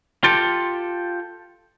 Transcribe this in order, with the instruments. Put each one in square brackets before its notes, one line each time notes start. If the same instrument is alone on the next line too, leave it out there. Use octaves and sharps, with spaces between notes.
[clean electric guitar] F4 G4 A4